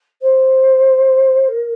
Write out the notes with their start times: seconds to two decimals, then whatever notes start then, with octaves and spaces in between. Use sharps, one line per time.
0.22 C5
1.48 A#4